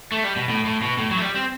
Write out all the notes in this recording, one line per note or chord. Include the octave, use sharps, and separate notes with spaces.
A3
G3
B2
A2
A2
B2
A2
F#3
A3
G3
C4